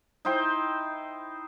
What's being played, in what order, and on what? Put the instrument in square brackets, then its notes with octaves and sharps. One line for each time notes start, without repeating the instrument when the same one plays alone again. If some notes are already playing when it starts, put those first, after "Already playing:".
[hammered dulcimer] D#4 E4 C5 G5